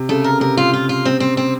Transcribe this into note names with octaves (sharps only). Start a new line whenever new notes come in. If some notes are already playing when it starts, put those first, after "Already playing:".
Already playing: C3
C#3 A3
A#4
C3 A#4
F4
F4
F4
C4
C4
C4